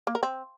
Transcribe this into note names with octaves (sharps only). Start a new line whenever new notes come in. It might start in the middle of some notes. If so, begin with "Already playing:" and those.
A#3
A#4
C4